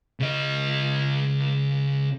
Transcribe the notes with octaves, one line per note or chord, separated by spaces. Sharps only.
C#3 D#5